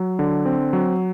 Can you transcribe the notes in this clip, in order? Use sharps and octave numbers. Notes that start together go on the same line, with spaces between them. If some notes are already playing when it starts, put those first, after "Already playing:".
Already playing: F#3
D3
C4
F#3